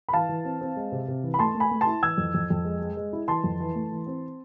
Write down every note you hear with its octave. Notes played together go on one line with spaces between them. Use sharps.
B5
E3 F5 A5
E3
C4
C4
G#3
C3
C3
E3
B5
A3 A5 C6
A3
G#5 B5
A3
A5 C6
E4
E3 E6 G#6
F2
F2
F2
G#3
G#3
G#3
E4
E3 A5 C6
F2
E3
A3
E3
C4